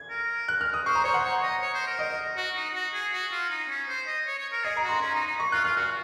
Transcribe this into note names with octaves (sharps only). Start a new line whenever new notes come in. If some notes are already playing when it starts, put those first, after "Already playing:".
Already playing: G#6
A#4
F#6
F6
D#6
C5 C#6
A#5
C5 C#5
F#5
C#5
D#5
C#5
C5
A#4
D#5
F#4
D#4
F#4
G#4
F#4
F4
D#4
C#4
C5
D#5
C#5
C#5
A#4
G#4 D#5
A#5
F#4
C6
C#4
D#4
D#4
C#6
F4 F#6
F4 F6
F#4 F6